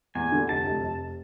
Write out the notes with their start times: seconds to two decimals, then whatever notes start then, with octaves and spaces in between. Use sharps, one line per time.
0.15 E2 G#5
0.32 D3
0.49 F1 A5
0.66 F1
0.83 F1